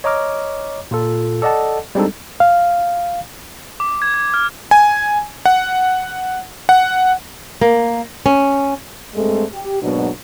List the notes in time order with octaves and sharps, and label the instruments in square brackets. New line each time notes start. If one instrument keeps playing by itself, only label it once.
[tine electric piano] C#5 D#5 A#5 D6 F6
A#2 F4 A4
A4 D5 D#5 F#5 A5
G3 G#3 C4 D4 D#4 A4
[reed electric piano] F5
[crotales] D6
G#6
G#6
F6
[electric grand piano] G#5
F#5
F#5
[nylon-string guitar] A#3
C#4
[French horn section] G2 G#3 A3 C4 A4
G4
G#2 B2 F#3 A#3 D4